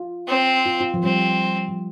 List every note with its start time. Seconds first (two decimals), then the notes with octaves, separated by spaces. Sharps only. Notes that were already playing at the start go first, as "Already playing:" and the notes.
Already playing: F4
0.27 C4
0.66 F4
0.81 F4
0.94 F3
1.03 G3 C4
1.68 F3